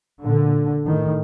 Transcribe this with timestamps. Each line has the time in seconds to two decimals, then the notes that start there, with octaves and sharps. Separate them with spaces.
0.23 A#2 D3
0.86 A2 D#3